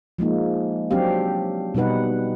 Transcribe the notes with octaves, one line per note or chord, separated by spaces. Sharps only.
F3 G#3 A#3 D#4
F#3 C4 D4 G4 F5
B2 G3 D#4 B4 F#5